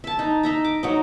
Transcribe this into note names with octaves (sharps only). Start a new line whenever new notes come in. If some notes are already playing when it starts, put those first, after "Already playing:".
E5 A5
D#4
D#4 E5 A#5
D6
F#3 D#4